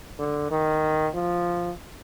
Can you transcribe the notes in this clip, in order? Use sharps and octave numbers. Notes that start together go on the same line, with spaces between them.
D3
D#3
F3